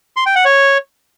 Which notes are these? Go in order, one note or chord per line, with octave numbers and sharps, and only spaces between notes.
C6
G5
F#5
C#5